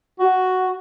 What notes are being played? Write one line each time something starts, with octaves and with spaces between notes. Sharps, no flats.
F#4